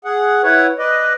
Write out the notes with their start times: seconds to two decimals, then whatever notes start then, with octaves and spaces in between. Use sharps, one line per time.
0.05 G#4 F#5
0.43 E4 B4 C#5 F#5
0.79 B4 D5 D#5